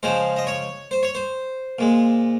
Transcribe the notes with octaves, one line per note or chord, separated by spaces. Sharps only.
C#3 F3 G#3 C5
D#5
C#5
C5
C#5
C5
A#2 G#3